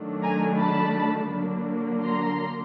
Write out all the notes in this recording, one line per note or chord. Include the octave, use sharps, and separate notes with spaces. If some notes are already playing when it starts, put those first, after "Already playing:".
Already playing: D#3 F#3 A3 D4
G#5 A#5
A5 B5
D3 F#3 A#3 D4
A#5 C6